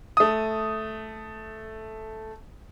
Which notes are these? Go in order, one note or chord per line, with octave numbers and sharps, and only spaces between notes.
A3 D#6